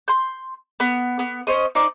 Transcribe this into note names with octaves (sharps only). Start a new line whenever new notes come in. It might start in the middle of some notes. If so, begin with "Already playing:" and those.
C6 G6
B3
B3
C#4 C5 D#5
D#4 C5 D5 D#5